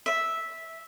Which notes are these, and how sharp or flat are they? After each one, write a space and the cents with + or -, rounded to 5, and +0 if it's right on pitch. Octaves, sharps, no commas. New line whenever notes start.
E5 -10